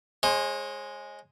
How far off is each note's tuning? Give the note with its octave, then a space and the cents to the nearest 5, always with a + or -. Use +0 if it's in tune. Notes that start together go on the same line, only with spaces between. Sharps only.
G#3 +0 C#5 -45